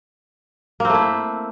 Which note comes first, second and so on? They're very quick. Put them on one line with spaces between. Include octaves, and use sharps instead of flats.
A#3 C4 A3 E4